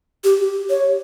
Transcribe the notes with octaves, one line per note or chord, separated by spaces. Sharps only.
G4
C#5